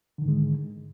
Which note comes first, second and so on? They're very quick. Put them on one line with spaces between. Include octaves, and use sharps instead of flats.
D3 D#3 G#2 G#3